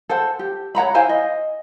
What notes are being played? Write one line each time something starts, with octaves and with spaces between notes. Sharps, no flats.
A4 C5 F#5
G4
C#5 F#5 A#5 B5
E4 C5 F5 G#5
D#5